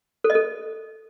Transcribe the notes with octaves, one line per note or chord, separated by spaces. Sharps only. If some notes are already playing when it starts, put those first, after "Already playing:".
A4
D#5
A4